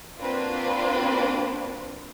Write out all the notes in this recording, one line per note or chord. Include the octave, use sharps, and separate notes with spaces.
A#3 C4 D4 F4 F#4 B4